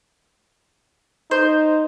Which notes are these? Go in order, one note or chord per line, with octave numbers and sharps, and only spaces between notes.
D#4 C5